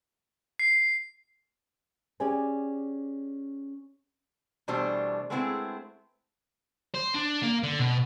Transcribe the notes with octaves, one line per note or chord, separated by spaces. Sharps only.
C7
C#4 G4 G#4 D5 G5 G#5
B2 E3 G3 A3 D4 C5
G#3 A3 B3 C4 E4 G#4
C5
D4
A#3
D3
B2